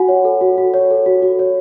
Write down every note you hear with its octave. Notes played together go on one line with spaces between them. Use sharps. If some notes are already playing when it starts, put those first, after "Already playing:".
Already playing: F#4 F#5 G#5
C#5
A4
F#4
F#4
C#5
A4
F#4
F#4
C#5